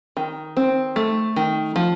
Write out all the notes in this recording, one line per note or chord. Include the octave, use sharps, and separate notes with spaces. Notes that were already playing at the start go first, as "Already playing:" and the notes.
D#3
C4
A3
D#3
F3